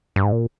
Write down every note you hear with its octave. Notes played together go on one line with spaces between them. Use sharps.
G2
G#2
A#2